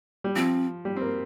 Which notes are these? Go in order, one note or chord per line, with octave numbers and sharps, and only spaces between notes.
G3
F3 C4
G3
C4
A#3